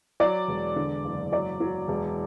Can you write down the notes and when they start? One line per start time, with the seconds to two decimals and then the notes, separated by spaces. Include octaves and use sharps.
0.20 F#3 D5
0.48 E1
0.76 D3
1.04 F#1
1.32 F#3 D5
1.60 F#3
1.88 E1